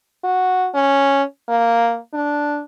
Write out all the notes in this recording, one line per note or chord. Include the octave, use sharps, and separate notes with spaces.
F#4
C#4
A#3
D4